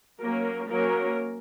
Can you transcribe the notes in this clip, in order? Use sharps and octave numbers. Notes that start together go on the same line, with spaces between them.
F#3 A#3 C#4 A#4
F#3 A#3 C#4 A#4